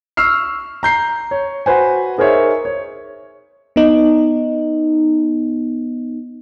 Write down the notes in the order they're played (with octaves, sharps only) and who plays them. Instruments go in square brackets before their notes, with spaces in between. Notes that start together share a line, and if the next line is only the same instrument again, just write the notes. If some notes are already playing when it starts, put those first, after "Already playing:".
[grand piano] C#6 E6 F6 C7
A#5 G6 C7
C#5
F#4 B4 C5 G#5
D#4 G#4 A#4 C5 C#5 E5
C#5
[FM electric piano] B3 D#4